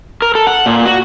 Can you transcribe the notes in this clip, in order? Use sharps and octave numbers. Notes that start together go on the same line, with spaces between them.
A#4
A4
F#5
A#2
F#4